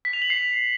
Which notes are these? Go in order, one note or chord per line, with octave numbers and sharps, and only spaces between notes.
B6
F7
F#7
C7